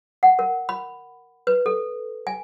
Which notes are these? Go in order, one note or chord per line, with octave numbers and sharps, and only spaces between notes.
F#5
A#4
B5
B4
A4
G#5